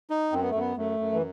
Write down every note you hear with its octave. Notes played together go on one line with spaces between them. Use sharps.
D#4
F#2 C4
B3
A3
F#2 B3
F#2 A3
F#2
E3